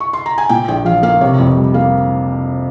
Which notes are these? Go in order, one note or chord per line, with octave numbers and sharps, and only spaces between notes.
C#6
C6
A#5
G#5
A#2 G5
A#1 G5
F3 F5
A#3 F5
C3 C#5
F2 C#5
G3
A#3 F5